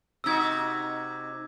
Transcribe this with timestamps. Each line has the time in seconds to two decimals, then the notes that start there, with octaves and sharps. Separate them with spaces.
0.24 C3 D#4 F#4 E6 G#6